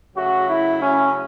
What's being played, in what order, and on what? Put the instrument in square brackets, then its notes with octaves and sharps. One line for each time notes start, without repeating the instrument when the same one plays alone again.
[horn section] C#3 F#3 A3 F#4
E4
C#4